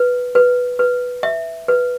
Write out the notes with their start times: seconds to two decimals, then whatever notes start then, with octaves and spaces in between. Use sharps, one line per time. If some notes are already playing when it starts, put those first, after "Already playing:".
Already playing: B4
0.35 B4
0.79 B4
1.23 E5
1.68 B4